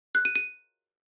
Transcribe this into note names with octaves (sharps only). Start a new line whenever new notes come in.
F#6
D#7
D#7